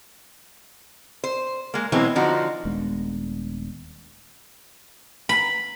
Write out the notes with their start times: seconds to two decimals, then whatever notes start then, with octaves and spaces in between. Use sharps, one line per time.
1.24 C5
1.74 G#3 A#3
1.92 B2 E3 F#3 G#3 C4
2.15 D3 F3 D#4 F#4
2.65 D#1 G#3 B3 D4
5.29 B5